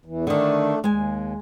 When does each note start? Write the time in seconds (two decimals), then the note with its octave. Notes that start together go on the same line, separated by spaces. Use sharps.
0.05 E2 E3
0.27 D3 D#3 A3 D4
0.84 D#2 G#3 G#5